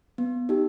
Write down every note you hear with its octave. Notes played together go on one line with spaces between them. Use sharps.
B3
D#4 G4